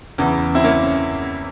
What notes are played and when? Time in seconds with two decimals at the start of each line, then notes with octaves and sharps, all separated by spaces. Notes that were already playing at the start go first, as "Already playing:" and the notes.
0.18 E2 C#3 E3
0.55 C4 E4
0.64 A#3 C#4